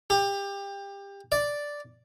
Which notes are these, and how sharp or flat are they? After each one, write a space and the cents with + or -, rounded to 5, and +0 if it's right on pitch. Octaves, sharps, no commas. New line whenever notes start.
G4 +25
D5 -5